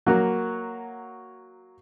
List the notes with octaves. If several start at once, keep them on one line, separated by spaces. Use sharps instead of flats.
F#3 A#3 F#4